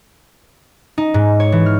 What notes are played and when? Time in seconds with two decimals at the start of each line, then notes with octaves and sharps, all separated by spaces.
0.98 D#4
1.14 G#2
1.40 C#5
1.52 E3
1.66 F6